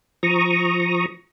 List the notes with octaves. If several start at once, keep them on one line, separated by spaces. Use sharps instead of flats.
F3 A#5 C#6 D#6